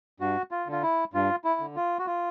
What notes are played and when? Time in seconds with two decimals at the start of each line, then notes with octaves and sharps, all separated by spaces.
0.20 G2 F#4
0.51 F4
0.67 D3
0.72 F4
0.83 E4
1.14 G2 F4
1.44 E4
1.60 D3
1.76 F4
1.99 F#4
2.06 F4